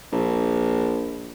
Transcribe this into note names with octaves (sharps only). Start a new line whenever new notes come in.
A#1